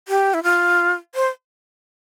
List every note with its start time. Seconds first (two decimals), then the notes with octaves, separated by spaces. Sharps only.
0.08 G4
0.34 E4
0.43 F4
1.15 C5